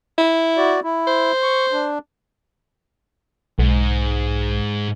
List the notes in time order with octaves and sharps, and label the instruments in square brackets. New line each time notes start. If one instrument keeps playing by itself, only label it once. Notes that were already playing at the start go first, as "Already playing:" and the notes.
[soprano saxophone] E4
[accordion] F#4 D5
E4
[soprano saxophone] C5
[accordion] C#6
D4
[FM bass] B1 [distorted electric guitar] G#2